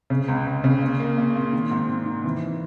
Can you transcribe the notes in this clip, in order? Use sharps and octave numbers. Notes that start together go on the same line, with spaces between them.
C#3
C#2
C#2
C#3
A#2
A#3
A#2
A#2
D#3
G#2
D#3
D#3
E3